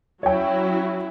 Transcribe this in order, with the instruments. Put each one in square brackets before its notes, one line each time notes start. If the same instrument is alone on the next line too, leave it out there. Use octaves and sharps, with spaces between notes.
[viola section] F#3 C#4 E4 [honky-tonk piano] C#5 G5